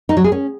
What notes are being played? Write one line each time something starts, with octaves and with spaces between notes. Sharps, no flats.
D#4
F#3
G#4
C#4